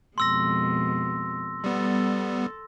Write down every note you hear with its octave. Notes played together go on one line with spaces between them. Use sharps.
F2 B2 G#3 C6 E6 A#6
G3 B3 A4